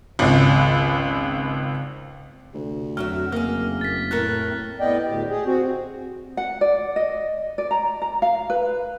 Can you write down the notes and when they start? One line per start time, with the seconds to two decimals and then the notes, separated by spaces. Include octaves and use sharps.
0.19 G#1 C#2
2.54 D2 C3
2.97 F2 F#3 A3 C4 F#4 E5 F6
3.32 F#1 A#3 G#4 F6
3.81 A6 B6
4.11 A2 A4 A#4 F#6
4.80 A2 B3 D5 D#5 G5
5.05 D2 A2 G4
5.29 G4 G#4
5.45 C4 F#4
6.37 F#5
6.61 D5
6.96 D#5
7.58 D5
7.71 A#5
8.02 A#5
8.22 F5
8.50 B4